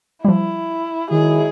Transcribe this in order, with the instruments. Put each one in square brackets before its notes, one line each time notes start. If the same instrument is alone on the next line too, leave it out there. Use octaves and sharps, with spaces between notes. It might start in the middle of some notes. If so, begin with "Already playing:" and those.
[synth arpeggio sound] F3 G3 [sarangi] E4
[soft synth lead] D#3 [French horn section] F#3 G#3 E4 [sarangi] G#4